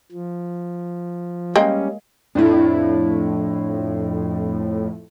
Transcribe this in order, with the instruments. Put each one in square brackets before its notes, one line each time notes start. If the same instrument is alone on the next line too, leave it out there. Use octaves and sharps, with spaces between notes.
[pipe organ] F3
[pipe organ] G3 C#4 [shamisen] G#3 A#3 G5
[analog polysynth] F2 A2 [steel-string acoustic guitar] D4 E4